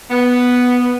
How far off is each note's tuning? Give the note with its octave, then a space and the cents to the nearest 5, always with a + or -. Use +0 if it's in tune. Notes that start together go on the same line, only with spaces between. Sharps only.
B3 +0